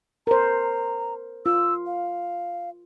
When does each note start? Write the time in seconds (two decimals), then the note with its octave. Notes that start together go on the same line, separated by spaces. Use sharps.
0.27 A#4 C5 A#5
1.46 F4 E6
1.86 F5